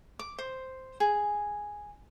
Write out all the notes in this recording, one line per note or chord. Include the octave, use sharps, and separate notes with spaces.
D6
C5
G#4